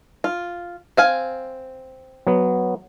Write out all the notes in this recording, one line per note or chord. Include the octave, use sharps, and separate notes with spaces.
F4
C4 F5 G#5
F#3 B3